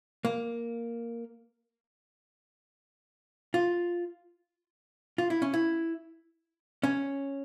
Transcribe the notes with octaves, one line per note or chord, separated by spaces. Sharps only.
A#3
F4
F4
E4
C#4
E4
C#4